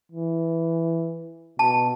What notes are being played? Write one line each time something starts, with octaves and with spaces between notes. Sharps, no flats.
E3
B2 A5